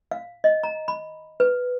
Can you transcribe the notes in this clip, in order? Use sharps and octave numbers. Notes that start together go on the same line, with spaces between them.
F5
D#5
A#5
B5
B4